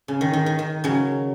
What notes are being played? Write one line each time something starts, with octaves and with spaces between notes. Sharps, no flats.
C#3
D#3
D#3
D#3
D#3
C#3 F#3